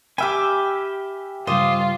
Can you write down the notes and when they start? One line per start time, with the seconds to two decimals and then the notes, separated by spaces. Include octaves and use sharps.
0.18 G4 E5 G5 G#5 B5 D6 F6
1.47 G2 C#3 G3 F4 C5 D#5 D6